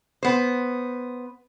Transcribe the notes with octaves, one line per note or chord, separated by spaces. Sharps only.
B3 C5